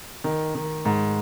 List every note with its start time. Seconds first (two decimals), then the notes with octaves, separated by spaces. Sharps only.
0.24 D#3
0.55 D#3
0.85 G#2